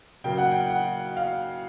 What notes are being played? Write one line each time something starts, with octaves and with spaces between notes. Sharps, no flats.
C#3 F#3 A#3 G5
F#5
G5
F#5
F5